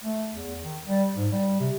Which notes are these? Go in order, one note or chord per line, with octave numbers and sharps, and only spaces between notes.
A3
E2
D#3
G3
G#2
G3
C3